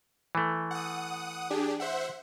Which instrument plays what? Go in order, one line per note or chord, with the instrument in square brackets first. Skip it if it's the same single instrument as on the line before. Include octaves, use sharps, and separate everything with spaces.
[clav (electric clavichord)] E3 A3
[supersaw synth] F#5 D#6
D4 G4 G#4
C5 E5 F#5